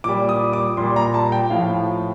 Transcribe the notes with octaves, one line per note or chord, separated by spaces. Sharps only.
A#2 G3 D6
D#6
D6
A#2 G3 C6
A#5
A5
G5
A2 F3 F5